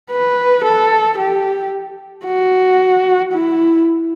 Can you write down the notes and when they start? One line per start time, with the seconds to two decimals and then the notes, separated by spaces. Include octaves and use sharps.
0.11 B4
0.64 A4
1.18 G4
2.26 F#4
3.32 E4